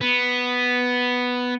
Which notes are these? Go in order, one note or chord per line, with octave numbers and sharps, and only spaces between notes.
B3